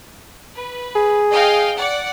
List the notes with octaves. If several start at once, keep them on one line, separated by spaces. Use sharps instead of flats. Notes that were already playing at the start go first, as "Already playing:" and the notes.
B4
G#4
D#5 F5 G5
D5 F#5